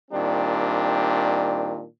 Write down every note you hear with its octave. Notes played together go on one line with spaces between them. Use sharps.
A#2 D#3 G3 C4 D4